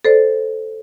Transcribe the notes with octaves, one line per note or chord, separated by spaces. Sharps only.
A4 C5 D5